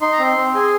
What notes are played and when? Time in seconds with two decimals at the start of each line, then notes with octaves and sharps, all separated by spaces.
0.01 D#4 C6
0.12 A#5
0.19 C4 C6
0.37 C4
0.55 G#4